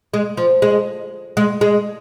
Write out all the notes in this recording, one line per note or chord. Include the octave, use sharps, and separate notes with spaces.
G#3
F3
G#3
G#3
G#3